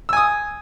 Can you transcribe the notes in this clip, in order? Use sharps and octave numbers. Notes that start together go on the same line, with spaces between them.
G#5 D#6 E6